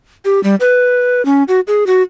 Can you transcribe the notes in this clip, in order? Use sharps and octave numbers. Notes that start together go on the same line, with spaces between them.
G4
G3
B4
C#4
F#4
G#4
F#4